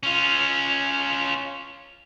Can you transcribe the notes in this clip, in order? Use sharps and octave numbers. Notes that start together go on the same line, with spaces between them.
C#4 F4